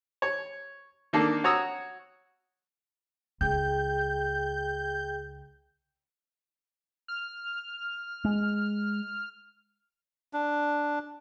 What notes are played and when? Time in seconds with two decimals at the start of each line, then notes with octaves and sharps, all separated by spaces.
0.22 C#5
1.13 D#3 A#3 D4 A4
1.44 F#4 C#5 A#5 D#6 E6
3.41 C#2 G#4 G5 G6
7.08 F6
8.25 G#3
10.33 D4